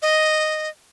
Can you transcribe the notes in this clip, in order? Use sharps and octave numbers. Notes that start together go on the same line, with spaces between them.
D#5